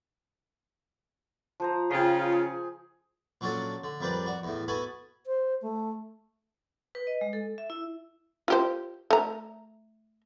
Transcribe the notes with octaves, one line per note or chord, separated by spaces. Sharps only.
F3 C5 A#5
C#3 F4 G#4 G5
G#4
A#2 F#3 C#4 D4 A4
D3
F2 G3 A#4 B4 D5
F#4 D5
E2 A2
B3 F#4 A4 G#5 B5
C5
A3
B4
D#5
G#3
A4
E5
E4
F4 G4 C5
A3 A#5